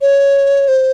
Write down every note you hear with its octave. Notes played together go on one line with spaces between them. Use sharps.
C#5
C5